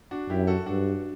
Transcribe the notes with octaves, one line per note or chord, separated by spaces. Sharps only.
D4 F#4
F#2 E4 G4
F#4 A4
G2 D4 F#4